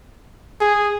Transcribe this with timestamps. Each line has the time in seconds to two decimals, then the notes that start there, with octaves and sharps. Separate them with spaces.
0.61 G#4